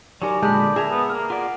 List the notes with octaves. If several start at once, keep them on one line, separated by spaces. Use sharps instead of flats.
F#3 D#4 G4 A#4 D5 G#5
A#2 D3 G#3 A5 B5 G6
G#4 A#4 E5 A#5
B3
A#3 F6
F4 D5 F#5